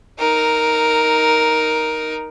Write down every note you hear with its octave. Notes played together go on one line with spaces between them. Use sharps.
D#4 A#4